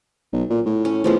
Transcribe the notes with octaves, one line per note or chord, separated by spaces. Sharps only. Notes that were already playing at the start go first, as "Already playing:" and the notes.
B1
A#2
A2
C#4
A2 F3 G#3 B3